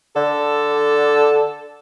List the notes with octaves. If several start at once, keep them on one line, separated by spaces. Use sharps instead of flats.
D3 A4